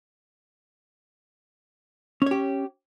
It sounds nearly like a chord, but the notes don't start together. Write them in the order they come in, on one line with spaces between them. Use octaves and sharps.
C#4 C#5 G4